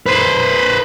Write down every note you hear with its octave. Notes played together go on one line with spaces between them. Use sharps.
B4 C5